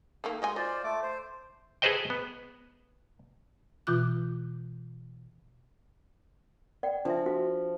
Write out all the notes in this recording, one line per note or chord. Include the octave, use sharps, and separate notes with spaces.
D#3 A3 A#3
G#3 F#4 D#5 G#5
F4 C5 D5 D#5
A3 D6
C5
G#4 A4 B4 C5 D#5 G5
B3
B2 E3 F4 D6 F#6
D5 F#5 G5
F3 D4 E5
F#4